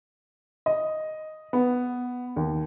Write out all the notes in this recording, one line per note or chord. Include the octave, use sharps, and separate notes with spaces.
D#5
B3
D#2